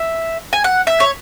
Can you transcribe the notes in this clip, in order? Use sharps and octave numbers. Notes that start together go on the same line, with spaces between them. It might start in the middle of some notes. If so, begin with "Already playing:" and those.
Already playing: E5
G#5
F#5
E5
C#5